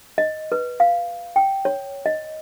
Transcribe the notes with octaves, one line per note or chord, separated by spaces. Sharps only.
D#5
B4
F5
G5
C#5
D#5